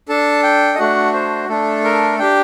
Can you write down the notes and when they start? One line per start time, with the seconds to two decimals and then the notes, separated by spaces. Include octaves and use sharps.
0.09 D4 A4 A5
0.43 G5
0.75 D#5
0.79 A3 D4 F#4 F#5
1.14 C5
1.49 A3 D4 A4
1.84 A#4
2.19 D4 G4 G5